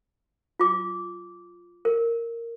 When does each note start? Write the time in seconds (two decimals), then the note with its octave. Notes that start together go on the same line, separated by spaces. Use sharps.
0.60 F4 D6
1.85 A#4